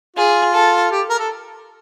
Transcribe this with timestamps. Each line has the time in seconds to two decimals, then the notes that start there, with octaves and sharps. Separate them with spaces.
0.16 F4 G#4
0.54 A4
0.91 G4
1.10 A#4
1.19 A4